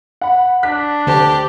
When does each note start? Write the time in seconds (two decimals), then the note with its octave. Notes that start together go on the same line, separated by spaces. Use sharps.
0.21 F#5 B5
0.63 D4 F#6 B6
1.07 D2 G4 C5 A5